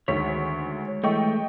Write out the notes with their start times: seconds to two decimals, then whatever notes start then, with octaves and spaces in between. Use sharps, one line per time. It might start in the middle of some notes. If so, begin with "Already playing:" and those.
0.08 D2 D#3 G#3 C#5 B6
1.04 E3 G#3 A3 D#5 G5 C#6